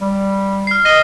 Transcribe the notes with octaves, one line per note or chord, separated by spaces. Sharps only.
G3
F6 C7
D#5 A#6 D#7 G7